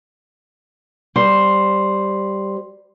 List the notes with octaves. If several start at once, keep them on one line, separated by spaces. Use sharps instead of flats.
G3 C5